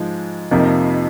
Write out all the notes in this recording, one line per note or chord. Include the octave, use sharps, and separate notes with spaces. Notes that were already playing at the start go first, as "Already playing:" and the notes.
Already playing: G#2 F3 G#3
F2 C3 F3 A#3 D#4